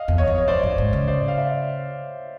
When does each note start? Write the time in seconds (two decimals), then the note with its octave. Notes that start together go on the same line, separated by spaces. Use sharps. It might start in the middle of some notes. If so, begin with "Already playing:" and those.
Already playing: D#5 F5
0.08 E2
0.18 C#5 D#5
0.27 E2
0.38 C#5
0.48 F2 C5 D5
0.63 G2
0.78 G#2
0.93 C#3
1.08 C5 D5
1.28 F5
1.37 D5 E5